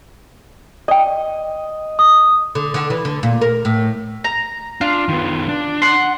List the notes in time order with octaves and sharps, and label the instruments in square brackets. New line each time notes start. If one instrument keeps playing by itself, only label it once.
[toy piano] D5 G5 [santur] D#5
[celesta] D#6
[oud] D3
D3
E3
D3
A#2
A#4
A2
[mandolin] A#5
[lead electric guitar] D4 [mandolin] F4
[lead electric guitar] D#3 B3
D4
[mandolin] F#5 C6